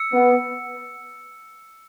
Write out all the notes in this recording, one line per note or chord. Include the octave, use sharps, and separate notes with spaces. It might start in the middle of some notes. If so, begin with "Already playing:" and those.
Already playing: E6 C#7
B3